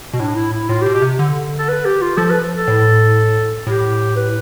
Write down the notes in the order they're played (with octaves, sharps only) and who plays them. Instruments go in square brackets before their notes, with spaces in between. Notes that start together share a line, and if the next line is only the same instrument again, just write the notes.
[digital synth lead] B2
[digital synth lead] A2 [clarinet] D4
[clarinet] E4
E4
[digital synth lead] A2 [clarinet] F4
[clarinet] G4
[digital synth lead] B2
[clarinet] G4
[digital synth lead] C3
D3
[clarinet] A4
B4
G4
F4
[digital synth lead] F3 [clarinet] A4
[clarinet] B4
A4
[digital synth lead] A2
[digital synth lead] A2 [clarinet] G4
[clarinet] B4